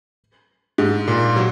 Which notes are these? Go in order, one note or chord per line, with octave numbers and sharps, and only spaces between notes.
G#2
A#2
F#3